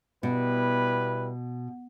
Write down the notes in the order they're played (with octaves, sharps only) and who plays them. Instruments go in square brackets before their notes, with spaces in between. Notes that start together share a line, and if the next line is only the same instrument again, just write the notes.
[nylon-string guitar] B2 [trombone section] G3 E4 B4